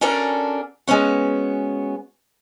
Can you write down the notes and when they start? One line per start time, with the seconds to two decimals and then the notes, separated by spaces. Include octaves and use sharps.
0.01 C#4 D4 F#4 A4 A#4 D5
0.87 G#3 B3 C#4 F#4